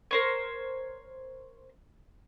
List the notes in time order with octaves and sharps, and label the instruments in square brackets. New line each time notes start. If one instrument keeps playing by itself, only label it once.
[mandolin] A#4 C5 C#5